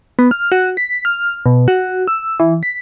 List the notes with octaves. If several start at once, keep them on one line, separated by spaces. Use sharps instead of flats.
B3
F6
F#4
B6
F6
B2
F#4
E6
E3
B6